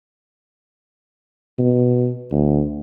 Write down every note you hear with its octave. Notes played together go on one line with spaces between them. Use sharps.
B2
D2